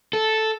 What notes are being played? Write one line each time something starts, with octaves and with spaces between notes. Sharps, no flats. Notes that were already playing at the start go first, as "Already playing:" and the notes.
A4